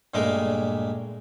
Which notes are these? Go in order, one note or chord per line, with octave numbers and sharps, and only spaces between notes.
G2 A#2 G#3 A3 A#4